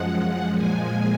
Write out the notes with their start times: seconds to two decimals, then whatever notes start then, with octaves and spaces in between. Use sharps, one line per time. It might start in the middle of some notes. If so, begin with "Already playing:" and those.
Already playing: F#2 F3 G#3 F#5
0.55 A#2 F3 G#3 G#5